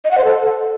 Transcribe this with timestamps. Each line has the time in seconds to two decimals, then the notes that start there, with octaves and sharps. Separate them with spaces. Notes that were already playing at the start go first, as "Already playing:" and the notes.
0.05 D#5
0.11 F#5
0.18 C5
0.24 A4